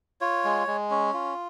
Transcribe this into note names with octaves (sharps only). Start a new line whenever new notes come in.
F4 C#5
G#3
G#3
C#4
F4